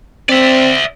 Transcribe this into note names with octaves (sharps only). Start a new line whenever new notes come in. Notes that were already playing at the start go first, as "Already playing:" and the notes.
C4 D5 E5